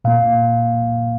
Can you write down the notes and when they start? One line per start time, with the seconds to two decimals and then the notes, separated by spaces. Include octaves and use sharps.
0.04 A#2 A#3 F5